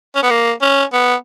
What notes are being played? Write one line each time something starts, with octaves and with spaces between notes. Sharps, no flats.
C#4
B3
A#3
C#4
B3